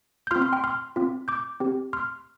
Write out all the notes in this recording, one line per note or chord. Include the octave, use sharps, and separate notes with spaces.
G6
C4 F4 C6 F6
C6 F6
G5 C6
C6 F6
C4 F4
D6 G6
C4 G4
C6 F6